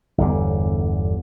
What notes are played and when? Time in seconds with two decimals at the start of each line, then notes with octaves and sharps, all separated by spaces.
0.18 G1 E2 D3